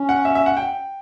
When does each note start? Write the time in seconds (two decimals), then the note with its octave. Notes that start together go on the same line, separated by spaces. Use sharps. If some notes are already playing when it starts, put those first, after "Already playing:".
Already playing: C#4
0.09 F#5
0.25 E5
0.35 E5
0.46 F#5
0.57 G5